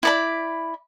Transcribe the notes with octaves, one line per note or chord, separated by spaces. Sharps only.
E4 D5 B5